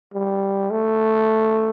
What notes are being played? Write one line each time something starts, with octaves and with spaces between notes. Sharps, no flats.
G3
A3